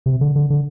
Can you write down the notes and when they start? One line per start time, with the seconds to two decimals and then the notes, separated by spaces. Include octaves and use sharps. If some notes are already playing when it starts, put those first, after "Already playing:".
0.06 C3
0.21 D3
0.35 D3
0.50 D3